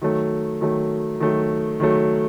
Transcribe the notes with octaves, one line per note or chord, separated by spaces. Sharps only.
D#3 F#3 A3
D#3 F#3 A3
D#3 F#3 A3
D#3 F#3 A3